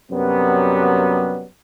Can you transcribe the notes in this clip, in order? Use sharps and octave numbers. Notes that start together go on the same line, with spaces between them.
F#2 C3 F#3 G3 B3